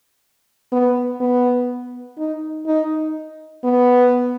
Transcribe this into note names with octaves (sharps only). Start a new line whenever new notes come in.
B3
B3
D#4
D#4
B3